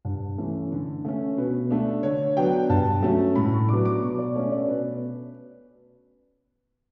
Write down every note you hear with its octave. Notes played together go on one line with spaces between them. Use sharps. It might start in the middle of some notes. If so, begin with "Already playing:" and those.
G2
E3 A3 C#4
D3
A3 C#4
B2 B4
A3 D4
D3 C#5
F#3 B3 D4 G5
G2 A5
F#3 A3 C#4
A2 B5
C#6
F#3 B3 D4 D6
D6
B2 C#6
D5
A3 C#4 C#5
D5
B2 B4